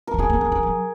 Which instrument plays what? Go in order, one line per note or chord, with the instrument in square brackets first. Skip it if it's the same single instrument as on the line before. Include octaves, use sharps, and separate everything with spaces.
[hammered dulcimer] A#4
[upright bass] F#3
[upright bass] G#3 [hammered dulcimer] G#4
[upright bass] A#3
A#3
G#3
F#3